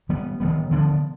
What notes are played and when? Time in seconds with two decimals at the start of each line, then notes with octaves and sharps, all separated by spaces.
0.09 D#3 G3 B3
0.40 D#3 G3 B3
0.71 D3 F3 B3 D4